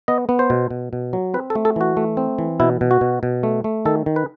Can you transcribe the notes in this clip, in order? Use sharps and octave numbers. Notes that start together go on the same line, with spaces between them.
B3 D#5
B3
C5
B2
B2
B2
F#3
C4 B4
A4
A3
A4
E3 F#4
A3
C4
E3
B2 E4
B2
F#4
B2
B2
A3
A3
D#3 A4
D#3
B4